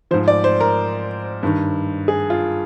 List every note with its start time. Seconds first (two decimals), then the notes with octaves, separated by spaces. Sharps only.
0.11 F3 C5
0.14 G#2
0.28 D5
0.44 C5
0.60 A#4
1.43 G2 D#3
2.08 G#4
2.30 F4